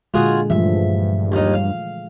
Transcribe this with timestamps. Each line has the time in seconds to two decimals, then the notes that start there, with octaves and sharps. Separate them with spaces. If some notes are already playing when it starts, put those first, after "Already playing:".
0.14 A#2 D3 G#3 F4 F#4 G#4
0.50 G2 E3 F3 A3 E5
1.32 D#2 D#4
1.53 F5